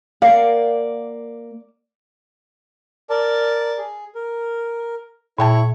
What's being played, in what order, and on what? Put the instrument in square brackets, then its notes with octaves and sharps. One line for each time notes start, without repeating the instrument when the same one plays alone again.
[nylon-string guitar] A#3 A#4 F#5 [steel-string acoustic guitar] D5 [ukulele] F5
[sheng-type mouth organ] A#4 D5 A5
G#4
A#4
[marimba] A#2 G5 A5 [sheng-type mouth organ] E4 C#5 C#6